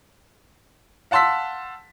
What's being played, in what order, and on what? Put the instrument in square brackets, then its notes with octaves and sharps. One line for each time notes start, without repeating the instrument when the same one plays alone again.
[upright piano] F5 F#5 A5 C6 E6 B6